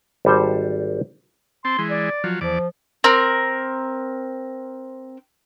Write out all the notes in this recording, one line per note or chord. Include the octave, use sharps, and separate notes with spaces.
G#1 G3 A4 C5
C4 A5 C6
E3 G#3
D5
F3 F#3
E2 F3 D5
C4 A#4